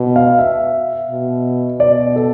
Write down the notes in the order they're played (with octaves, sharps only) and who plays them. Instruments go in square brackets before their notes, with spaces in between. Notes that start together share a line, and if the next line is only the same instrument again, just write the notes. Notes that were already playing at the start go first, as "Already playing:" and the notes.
Already playing: [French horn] B2
[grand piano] F5
E5
[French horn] B2
[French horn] B2 [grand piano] D5
[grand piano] A4